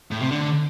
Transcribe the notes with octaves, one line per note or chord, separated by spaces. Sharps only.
A2
C3
D3